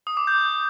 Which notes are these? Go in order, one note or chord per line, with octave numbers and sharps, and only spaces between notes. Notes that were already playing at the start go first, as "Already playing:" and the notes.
D#6
D6
G6